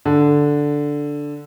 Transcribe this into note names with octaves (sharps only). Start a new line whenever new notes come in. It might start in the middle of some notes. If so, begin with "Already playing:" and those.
D3